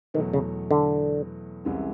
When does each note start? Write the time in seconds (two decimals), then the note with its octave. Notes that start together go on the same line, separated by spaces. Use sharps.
0.14 E2 B2 D#3 F#3 A3
0.33 C#3
0.71 D3
1.65 C2 C3 E3 G#3 C#4